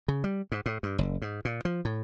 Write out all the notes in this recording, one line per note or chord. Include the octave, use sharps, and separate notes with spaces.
C#3
G3
G#2
A2
G2
F#1
G#2
A#2
F3
A2